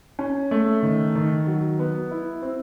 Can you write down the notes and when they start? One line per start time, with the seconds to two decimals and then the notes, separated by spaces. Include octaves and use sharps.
0.19 C#4
0.51 A3
0.83 D#3
1.15 D#3
1.47 F#3
1.79 B3
2.11 E4
2.42 C4